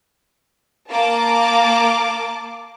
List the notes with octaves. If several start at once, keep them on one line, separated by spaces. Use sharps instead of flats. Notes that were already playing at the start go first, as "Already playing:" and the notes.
A#3 A5 D6